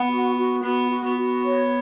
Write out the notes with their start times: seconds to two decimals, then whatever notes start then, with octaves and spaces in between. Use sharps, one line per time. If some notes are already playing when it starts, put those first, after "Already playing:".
Already playing: B3 F#5
0.09 F#4
0.37 F#4
0.63 B3 F#4
0.90 F#4
1.04 B3
1.17 F#4
1.45 C#5